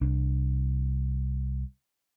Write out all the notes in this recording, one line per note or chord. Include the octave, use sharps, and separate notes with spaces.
C2 D4